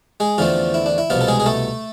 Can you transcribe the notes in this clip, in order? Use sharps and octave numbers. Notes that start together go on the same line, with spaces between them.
G#3 G#4
E2 D3 F3 A3 C4 F4
E4
D4
E4
C2 B2 F3 B3 F4
A4
G#3 G#4
G#4
A3 A4